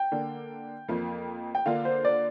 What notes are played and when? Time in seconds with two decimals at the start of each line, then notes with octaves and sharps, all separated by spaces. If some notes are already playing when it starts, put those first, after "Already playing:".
Already playing: G5
0.12 D3 A#3 D4
0.88 F2 F3 A#3 F4
1.55 G5
1.66 D3 A#3 D4 F4 F5
1.85 C5
2.05 D5